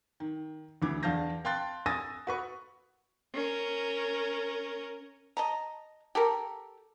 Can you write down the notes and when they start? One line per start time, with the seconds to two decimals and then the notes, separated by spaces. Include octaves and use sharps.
0.20 D#3
0.82 D2 E3 D6
1.03 E2 D4 F5 A5 G6 A#6
1.45 F5 G5 A5 C6 F#6 A6
1.86 G#5 D#6 E6 A6 A#6 D#7
2.27 F#4 B4 C#6
3.34 C#4 A#4
5.37 D#5 A5 A#5
6.15 G4 A4 A#4